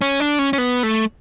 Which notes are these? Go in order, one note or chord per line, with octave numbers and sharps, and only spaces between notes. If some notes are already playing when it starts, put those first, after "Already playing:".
C#4
D4
C#4
C#4
B3
A3